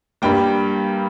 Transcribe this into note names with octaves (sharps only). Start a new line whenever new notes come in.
G2 G3 A#3 G5